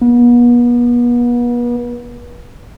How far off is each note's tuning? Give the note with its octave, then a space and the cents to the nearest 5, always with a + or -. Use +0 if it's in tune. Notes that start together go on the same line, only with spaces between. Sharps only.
B3 -40